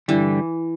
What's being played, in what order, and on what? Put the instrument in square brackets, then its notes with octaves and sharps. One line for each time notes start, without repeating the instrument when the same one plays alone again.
[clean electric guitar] G2 D3 G3 [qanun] E3